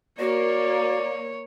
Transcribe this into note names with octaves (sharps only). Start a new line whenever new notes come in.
A#3 F#4 C#5 D5